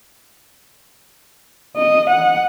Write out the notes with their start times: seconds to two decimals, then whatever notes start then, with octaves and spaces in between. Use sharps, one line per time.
1.76 D#5
2.10 F#5